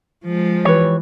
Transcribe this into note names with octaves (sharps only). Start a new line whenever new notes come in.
F3 G#3
E3 G4 B4 C#5